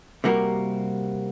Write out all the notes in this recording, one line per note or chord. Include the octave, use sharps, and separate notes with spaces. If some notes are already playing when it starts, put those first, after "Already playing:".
C3 G3 A#3 F#4 A#4